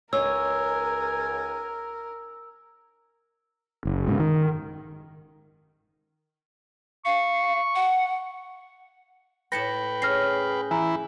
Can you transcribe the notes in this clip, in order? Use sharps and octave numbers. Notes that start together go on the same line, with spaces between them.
C#2 D#4 A#4 C#5 G#5 E6
F#1
G#2 C#3
D#3
F5 C#6
F#5
A2 B4 G5 A5 B5 A#6 C#7
C#4 G#4 F6 A#6 C7
E3 E4 G#5 A#5